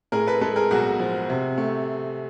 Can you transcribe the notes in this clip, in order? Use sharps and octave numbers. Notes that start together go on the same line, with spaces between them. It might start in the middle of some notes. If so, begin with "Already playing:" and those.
A2 G#4 A#4
A4 B4
G#3 A4 B4
G#4 A#4
B1 F#4 G#4
F3
C3
A3